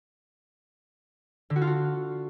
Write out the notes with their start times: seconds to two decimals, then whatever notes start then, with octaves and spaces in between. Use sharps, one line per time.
1.50 D3
1.56 F#4
1.61 F4
1.67 F#4